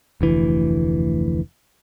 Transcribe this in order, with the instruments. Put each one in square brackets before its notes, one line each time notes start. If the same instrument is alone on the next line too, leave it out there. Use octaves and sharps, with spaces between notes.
[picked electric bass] F1 D2 E3